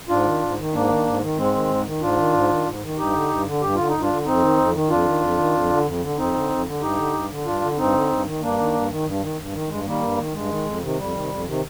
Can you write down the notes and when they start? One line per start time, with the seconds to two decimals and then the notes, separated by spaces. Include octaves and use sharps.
0.09 G#2 D4 F4
0.25 D#3
0.42 G#2
0.58 D#3
0.73 G#2 A#3 D4
0.89 D#3
1.06 G#2
1.21 D#3
1.37 G#2 G#3 C4
1.53 D#3
1.69 G#2
1.85 D#3
2.01 G#2 D4 F4
2.17 D#3
2.33 G#2
2.49 D#3
2.65 G#2
2.81 D#3
2.97 G2 D#4 G4
3.13 D3
3.29 G2
3.45 D3
3.61 G2 G4
3.75 D3 F4
3.88 G2 D#4
4.01 D4 F4
4.10 D3
4.25 F2 C4 D#4
4.41 D#3
4.57 F2
4.73 D#3
4.89 F2 D4 F4
5.05 D#3
5.21 F2
5.38 D#3
5.54 F2
5.70 D3
5.85 F2
6.01 D3
6.17 F2 C4 D#4
6.34 D3
6.49 F2
6.65 D3
6.81 G2 D#4 G4
6.97 D3
7.13 G2
7.29 D3
7.45 G2 D4 F4
7.61 D3
7.77 G2 C4 D#4
7.93 D3
8.09 G2
8.25 D#3
8.41 G2 A#3 D4
8.58 D#3
8.74 G2
8.89 D#3
9.06 G2
9.21 D#3
9.38 G2
9.53 D#3
9.69 G2 G#3
9.85 D#3 G3 A#3
10.01 G2
10.17 D#3
10.33 G2 G#3
10.49 D#3
10.65 F2
10.82 C3 D#3
10.97 F2 G3
11.13 C3 D#3
11.29 F2
11.45 C3 D#3